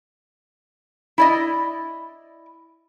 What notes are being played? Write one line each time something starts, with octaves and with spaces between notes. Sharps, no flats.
E4 D5 D#5